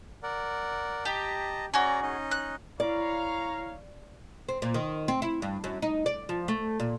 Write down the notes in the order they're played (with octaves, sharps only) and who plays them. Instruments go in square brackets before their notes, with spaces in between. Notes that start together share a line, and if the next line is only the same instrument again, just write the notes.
[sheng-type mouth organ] A#4 D5 F#5
[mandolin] G4 [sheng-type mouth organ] D#5 A5 A#5
[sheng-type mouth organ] C#4 D5 A#5 [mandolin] F#4 G#4
[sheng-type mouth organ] C#4 D#4 D#5
[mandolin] F#6
[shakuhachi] E4 [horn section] C#5 F5 [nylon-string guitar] D5 [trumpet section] A#5
[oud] C4
A#2
D#3
C4
E4
G2
F#2
D#4
D5
F3
A3
A#2